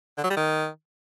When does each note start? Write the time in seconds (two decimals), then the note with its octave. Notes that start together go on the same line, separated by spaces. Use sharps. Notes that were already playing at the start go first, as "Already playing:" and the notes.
0.18 D3
0.24 F#3
0.30 G3
0.37 D#3